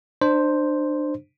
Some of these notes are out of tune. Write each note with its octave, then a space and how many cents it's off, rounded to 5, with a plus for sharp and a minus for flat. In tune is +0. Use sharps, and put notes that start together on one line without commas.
D4 +30 C5 +0